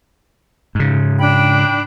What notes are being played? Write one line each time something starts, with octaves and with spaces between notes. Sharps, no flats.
G#2 C#3
D4 G5 B5